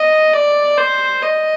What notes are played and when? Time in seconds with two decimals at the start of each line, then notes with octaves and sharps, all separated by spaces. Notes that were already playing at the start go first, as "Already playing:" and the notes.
Already playing: D#5
0.34 D5
0.78 C5
1.23 D#5